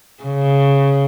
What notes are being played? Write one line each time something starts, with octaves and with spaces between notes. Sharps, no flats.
C#3